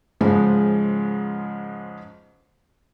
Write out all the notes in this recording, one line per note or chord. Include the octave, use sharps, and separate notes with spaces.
G#2 C#3 F3 G#3